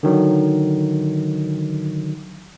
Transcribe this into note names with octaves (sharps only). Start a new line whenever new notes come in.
D3 D#3 F#3